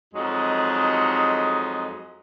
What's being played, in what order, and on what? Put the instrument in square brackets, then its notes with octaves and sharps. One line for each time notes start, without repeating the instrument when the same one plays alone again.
[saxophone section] F2 F#3 G#3 D#4